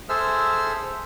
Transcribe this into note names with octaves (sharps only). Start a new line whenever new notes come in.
G#4 A4 C5 E5 E6 F6